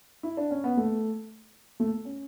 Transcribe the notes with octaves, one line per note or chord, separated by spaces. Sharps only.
E4
D4
C#4
B3
A3
A3
C#4